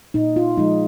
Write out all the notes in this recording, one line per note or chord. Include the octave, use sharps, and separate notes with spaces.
A#2 D#4
F4
F3 G#3 D#4